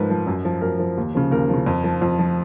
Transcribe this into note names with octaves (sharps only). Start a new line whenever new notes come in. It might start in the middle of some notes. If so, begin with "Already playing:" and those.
Already playing: G#2 F3 A#4 B4
F3
F#2
F3
F#2 A#4
F3
D#2
C#3 F3
D#2 A#4
C#3 F3
F2
F3
F2
F3